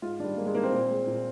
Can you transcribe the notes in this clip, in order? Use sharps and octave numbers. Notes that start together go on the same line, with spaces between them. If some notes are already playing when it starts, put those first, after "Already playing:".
G#2 F4
D#3 G3 D4
G#2 A#3
G#3
D#3 G3 A#3
C4
A#2
G#3
A#2